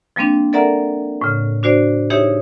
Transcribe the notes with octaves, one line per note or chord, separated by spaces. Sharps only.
F3 G3 A#3 C4 D4
A4 A#4 D5 E5 F#5 A#5
A2 C#3
D4 F#4 C5 D5
D#4 E4 G4 G#4 C#5 E5